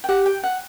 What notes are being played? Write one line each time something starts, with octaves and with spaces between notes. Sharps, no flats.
G5
G4 F#5
G5
F#5